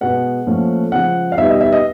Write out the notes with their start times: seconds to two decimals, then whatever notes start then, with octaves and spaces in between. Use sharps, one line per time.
0.01 B2 G#3 B3 F#5
0.46 A#2 F3 A3 C#4
0.92 C#3 F3 G#3 F#5
1.32 F5
1.38 E2 B2 G3 B3 D#4 E5
1.49 D#5
1.61 E5
1.72 D#5